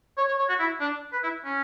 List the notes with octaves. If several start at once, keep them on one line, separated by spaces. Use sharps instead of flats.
C#5
C#5
C#5
F#4
E4
D4
B4
E4
C#4